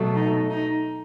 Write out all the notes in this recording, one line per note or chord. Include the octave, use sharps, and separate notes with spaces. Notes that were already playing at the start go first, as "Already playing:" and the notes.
Already playing: B2 F#3 A3
D#4
D#4